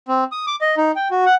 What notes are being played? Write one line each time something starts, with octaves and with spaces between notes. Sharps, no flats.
C4
D#6
D6
D#5
D#4
G5
F#4
F#5